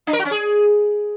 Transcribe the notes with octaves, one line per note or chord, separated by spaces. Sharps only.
D4
A#4
F#4
C#4
G#4